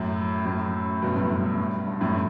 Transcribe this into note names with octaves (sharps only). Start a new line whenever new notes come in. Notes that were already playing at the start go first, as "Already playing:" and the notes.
Already playing: F#2 A2
F#2 A2
G2 B2
F#2 A2
G2
G2
F#2 A2